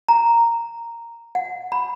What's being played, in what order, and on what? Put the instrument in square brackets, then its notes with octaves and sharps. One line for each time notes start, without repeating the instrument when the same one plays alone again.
[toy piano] A#5
F#5
B5